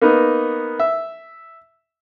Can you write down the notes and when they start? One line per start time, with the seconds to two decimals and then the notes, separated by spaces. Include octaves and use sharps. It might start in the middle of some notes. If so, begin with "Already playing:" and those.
0.01 A#3 B3 D#4
0.80 E5